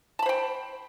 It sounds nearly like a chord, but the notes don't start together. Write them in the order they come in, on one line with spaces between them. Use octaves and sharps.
A5 B5 C5 G5